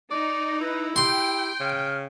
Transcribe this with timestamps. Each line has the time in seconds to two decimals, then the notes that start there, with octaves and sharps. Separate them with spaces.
0.11 D#4 D5
0.61 E4 B4
0.96 G4 G5 C6
1.60 C#3 F6